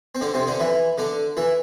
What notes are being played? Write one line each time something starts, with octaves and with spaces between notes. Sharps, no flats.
C4
D3 D4
C3 C4
D3 D4
E3 E4
D3 D4
E3 E4